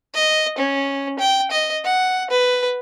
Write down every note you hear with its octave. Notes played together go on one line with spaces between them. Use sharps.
D#5
C#4
G5
D#5
F#5
B4